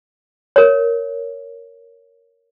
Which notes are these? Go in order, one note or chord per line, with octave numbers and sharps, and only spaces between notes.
A#4 C#5